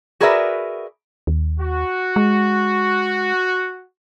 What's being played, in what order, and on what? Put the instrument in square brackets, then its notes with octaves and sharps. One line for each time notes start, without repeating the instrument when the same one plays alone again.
[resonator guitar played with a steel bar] F#4 G#4 A#4 B4 D5 E5
[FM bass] D#2
[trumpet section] F#4
[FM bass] G#3